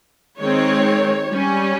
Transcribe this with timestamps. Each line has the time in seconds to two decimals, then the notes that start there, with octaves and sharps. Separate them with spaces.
0.40 D#3 G#3 C4 C#5
1.28 G3 C#4